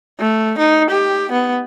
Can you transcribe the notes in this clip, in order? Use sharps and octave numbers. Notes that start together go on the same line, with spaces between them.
A3
D#4
G4
B3